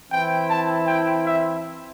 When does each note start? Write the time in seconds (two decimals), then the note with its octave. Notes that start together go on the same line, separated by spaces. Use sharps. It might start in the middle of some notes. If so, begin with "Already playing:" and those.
0.10 E3 C4 E4 G5
0.48 A5
0.87 G5
1.25 E5